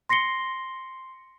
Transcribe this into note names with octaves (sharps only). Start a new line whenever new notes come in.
C6 A#6 C7 C#7 G7